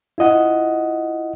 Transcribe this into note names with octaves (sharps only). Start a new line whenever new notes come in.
E4 F4 D#5 F#5